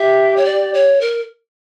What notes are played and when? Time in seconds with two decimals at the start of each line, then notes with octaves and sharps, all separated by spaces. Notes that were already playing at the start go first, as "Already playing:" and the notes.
Already playing: G4 E5
0.37 C#5
0.45 D5
0.74 C#5
1.01 A#4